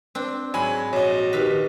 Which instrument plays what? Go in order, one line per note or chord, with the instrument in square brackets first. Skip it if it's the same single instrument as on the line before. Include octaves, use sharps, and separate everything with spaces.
[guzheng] C4 D4
[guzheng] G#2 [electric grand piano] F#3 G#5 B5
[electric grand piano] A#1 D#5 [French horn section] F#4 [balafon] C#5
[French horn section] D#3 G4 [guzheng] B4 E5 F5